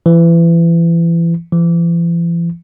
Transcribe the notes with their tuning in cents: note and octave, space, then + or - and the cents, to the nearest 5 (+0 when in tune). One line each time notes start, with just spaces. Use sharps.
E3 +30
E3 +45